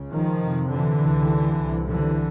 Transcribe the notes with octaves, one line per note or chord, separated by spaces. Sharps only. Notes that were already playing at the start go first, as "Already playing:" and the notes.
Already playing: C#2 C#3
D#3 F3
F2 C3
D3 E3
C#2 C3
C2 C3
D3 E3